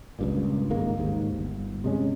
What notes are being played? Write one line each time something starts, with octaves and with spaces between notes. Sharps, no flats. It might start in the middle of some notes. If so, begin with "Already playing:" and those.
C#2 G2 A#2
G#1 D#3 G#3 A#3
D#2 G#2
G1
C3 G#3 C#4